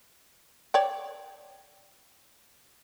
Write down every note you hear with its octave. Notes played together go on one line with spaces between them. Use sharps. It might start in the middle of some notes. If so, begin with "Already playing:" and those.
C#5 D5 G5